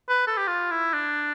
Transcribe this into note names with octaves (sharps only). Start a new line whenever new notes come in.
B4
A4
G4
F4
E4
D4